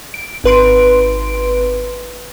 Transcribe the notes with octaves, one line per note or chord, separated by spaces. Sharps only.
D7
G#1 B4 C6 D7